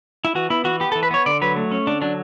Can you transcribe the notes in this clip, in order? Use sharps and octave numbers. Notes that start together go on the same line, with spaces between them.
E4
E3 F#4
B3 E4
E3 F#4
B3 G4
A4
E3
B4
B3 C#5
D3 D5
F#3 B4
A3
C#4
D3 D4
F#3 D4